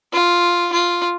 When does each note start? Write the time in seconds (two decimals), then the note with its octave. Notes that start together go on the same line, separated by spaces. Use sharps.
0.13 F4
0.72 F4